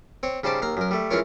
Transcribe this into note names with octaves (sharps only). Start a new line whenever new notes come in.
C4 C#5
C#3 G3 D#4 C5 A5 D6
D#2 F5 A#5
F#2 A#4
G3 A3
E3 G#3 C#4 F4 A#4 C#5